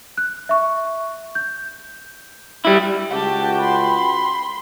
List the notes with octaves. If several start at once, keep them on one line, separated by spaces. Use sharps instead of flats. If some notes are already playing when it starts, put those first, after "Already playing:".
F#6
E5 C#6
G6
G3 E4
C#2 F#4 G4 G5 A5
B5 C6